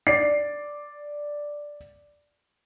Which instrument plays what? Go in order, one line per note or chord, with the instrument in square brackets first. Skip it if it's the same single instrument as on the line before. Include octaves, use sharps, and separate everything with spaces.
[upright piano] D5 C7